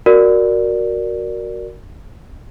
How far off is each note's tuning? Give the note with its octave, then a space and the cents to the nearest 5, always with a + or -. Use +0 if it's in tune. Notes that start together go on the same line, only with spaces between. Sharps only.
F#4 +0 A#4 +0 D5 +0